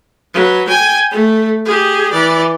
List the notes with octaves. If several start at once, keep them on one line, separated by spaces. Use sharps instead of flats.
F#3 B4
G5 G#5
A3
G4 G#4
E3 D5